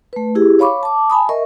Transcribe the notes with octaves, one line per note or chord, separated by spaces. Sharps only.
A3 B4
E4 G4 G#4
C#5 F5 B5 C#6 D6
A5 D6
G#5 A5 B5 D#6
A#4 D#5 E5 C#6